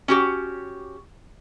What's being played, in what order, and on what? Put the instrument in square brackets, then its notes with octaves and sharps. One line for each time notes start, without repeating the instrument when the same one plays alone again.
[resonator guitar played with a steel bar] C#4 F#4 G4